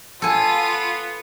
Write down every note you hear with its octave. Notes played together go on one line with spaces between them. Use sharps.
B3 F4 A4 G#5 D#7